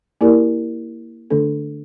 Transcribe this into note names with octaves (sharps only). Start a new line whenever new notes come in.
A#3 E4 G4 A#4 D5
D3 A3 D4 A4